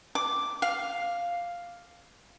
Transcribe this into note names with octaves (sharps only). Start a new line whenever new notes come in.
D6
F5